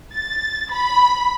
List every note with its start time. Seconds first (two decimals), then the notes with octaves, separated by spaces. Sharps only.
0.14 A6
0.72 B5